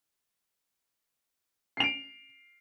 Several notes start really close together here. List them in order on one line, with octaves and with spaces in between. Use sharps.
C7 F7 D7